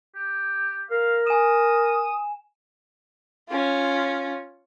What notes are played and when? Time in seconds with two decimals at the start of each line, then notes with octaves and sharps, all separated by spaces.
0.15 G4
0.91 A#4 F5
1.27 G#5 D#6 E7
3.49 C#4 F4